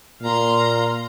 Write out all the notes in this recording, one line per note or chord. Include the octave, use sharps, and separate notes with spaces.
A#2 F5 A#5 C6